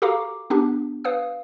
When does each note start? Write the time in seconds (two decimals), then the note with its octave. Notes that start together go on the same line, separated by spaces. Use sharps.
0.02 F#4 G4 A4 F5 A#5 D6
0.50 B3 D4 G4
1.04 B4 F5 D#6